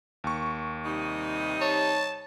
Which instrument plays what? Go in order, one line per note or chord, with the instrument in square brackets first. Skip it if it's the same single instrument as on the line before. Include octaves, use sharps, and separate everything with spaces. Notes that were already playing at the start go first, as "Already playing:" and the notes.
[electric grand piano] D#2 C#6
[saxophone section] C3 G3 D#4
[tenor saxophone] C#5 [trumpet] A5